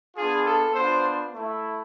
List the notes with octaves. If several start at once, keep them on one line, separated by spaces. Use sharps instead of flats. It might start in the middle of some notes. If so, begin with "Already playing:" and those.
B3 D4 F4 G#4
A4
B3 D4 F4 C5
A3 E4